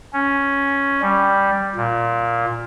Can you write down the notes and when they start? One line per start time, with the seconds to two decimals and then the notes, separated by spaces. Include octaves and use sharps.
0.13 C#4
1.01 G3
1.76 A#2